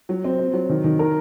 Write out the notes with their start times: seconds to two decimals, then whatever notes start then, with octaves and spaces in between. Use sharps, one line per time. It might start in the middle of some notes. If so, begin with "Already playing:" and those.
0.09 F#3
0.24 C4
0.39 C4
0.53 F#3
0.69 D#3
0.84 D#3
0.99 A#4